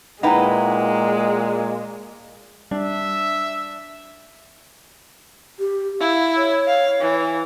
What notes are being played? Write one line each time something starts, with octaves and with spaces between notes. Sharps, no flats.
A#2 G#3 D#4 E4 B4 F#5 G5 A#5
G3 D4 E5
G4
E4 F5
C#5
F5
E3